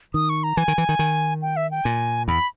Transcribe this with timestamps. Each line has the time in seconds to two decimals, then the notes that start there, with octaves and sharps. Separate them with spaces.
0.14 D#3 D#6
0.29 C#6
0.44 A#5
0.57 E3 G#5
0.68 D#3
0.78 E3
0.89 D#3
0.99 D#3
1.42 G5
1.57 E5
1.71 G5
1.85 A#2 G#5
2.28 E2 B5